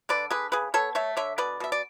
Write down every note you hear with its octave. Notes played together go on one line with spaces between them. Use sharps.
D3 B4 D5
D3 G#4 B4
C#3 G#4 B4
B3 A4 C#5
A3 C#5 E5
D3 C#5 E5
B2 B4 D5
B2 E5
D5